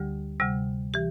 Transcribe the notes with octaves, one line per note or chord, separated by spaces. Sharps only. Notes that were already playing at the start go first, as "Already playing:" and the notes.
Already playing: D2 D3 G3 G4
D2 C3 G3
E3 G4